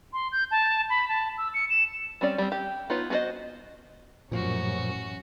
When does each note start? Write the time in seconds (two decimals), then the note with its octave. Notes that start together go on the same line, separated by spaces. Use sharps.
0.13 C6
0.32 G6
0.51 A5
0.90 B5
1.09 A5
1.38 E6
1.54 C#7
1.70 E7
2.21 G3 C4 C#4 D5
2.38 G3 C4
2.52 G4
2.90 B3 D#4 F4 C#5
3.10 B3 F#4 G#4 C5 D#5
4.31 A1 F#2 A#2 F3 C#4 F#4